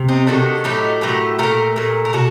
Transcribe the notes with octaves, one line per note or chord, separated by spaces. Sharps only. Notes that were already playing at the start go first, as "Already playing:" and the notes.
Already playing: C3
C4 D#4
C3 D#3 A3 D4 F#4
A2 F#3 A3 D#4 G4
A2 F#3 A3 G4 A#4
A#2 A3 G4 A#4
A#2 A3
A#4
C3 F#4 A4